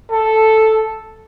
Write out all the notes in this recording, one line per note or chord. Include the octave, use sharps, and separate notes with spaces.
A4